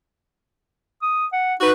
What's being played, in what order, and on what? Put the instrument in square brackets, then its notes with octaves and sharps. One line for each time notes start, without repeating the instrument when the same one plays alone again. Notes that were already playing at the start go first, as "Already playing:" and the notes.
[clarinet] D#6
F#5
[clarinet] D#4 [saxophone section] F#4 B4